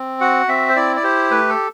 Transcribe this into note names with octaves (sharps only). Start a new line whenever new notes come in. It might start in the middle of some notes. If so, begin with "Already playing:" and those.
Already playing: C4
F#4 F#5
C4 E5
C5
E4 D5
D5
G4 C5
A3 B4
A4